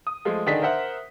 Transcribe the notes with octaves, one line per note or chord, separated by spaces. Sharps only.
D#6
F3 G#3 A3
D3 D#3 D4 G#4 D#5 B6
A#4 C5 E5 F#5